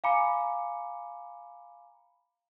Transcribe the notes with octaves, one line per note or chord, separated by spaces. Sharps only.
F5 G#5 A#5 B5 D6 C#7